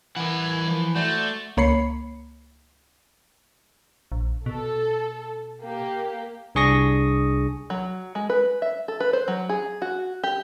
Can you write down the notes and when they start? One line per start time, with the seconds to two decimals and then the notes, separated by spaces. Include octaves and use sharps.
0.16 E3 A#4 F#5
0.68 F3
0.96 A3 F#4 C5 D5
1.57 C#2 A#3 C#5 B5 C7 C#7
4.12 A#1
4.46 B2 A4
5.62 A#3 G4
6.55 C2 D4 G#4 C#6 D#6 A#6
7.70 F#3
8.15 G#3
8.30 B4
8.62 E5
8.88 A4
9.00 B4
9.13 C5
9.28 F#3
9.49 G#4
9.82 F#4
10.23 G4